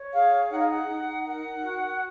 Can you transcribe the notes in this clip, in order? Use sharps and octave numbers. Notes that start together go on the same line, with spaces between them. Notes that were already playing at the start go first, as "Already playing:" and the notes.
Already playing: C#5
G#4 F5
D#4 F#5
F5
F#5
D#4
A#4 F#5
F#4